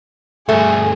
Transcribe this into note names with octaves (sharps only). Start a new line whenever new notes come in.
D2 G2 A3 G#4